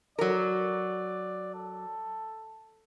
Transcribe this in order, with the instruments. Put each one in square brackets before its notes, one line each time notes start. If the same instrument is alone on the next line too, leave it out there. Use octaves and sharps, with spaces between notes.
[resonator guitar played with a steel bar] F#3 A#4 [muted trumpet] D5
[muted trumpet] A4